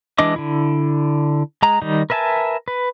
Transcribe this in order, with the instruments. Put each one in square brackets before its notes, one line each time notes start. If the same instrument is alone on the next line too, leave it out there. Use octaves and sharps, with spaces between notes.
[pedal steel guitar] E3 G#3 D4 D#5 D6
D3 E4
G#3 A#5
D#3 G3 D#4
A#4 B4 E5 G#5 A5
B4